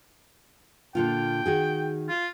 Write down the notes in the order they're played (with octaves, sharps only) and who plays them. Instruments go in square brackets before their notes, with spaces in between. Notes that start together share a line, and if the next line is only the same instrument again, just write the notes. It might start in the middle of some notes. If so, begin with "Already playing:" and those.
[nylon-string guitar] A#2 D3 F4 [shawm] G5
[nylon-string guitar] D#3 F#4 G#4
[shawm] F4